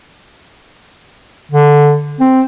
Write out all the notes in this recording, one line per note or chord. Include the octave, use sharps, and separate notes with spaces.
D3
C4